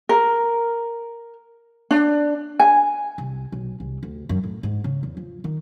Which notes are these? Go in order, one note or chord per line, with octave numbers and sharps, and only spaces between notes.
A#4
D4
G#5
C2
B1
C2
D2
F#2
A2
G#2
C#3
E2
F3
D#3